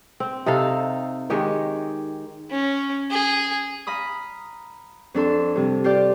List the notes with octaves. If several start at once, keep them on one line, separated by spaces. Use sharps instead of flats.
C4
C3 D#4 A4 F5
D#3 G#3 G4 C#5
C#4
G#4
F5 A#5 B5 D#6
F2 D4 A4 C6
G2 C3
F4 G4 D5